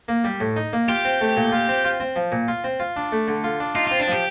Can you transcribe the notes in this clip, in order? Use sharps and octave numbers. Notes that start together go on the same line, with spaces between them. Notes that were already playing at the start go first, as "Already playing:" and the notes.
A#3
G3
A2
D#4
A#3
F4 G4
C4
A3
A#2
F4
C4
F4
C4
F3
A#2
F4
C4
F4
D4
A3
D3
F4
D4
D#4 F4
C4 F4
D4
F3 G4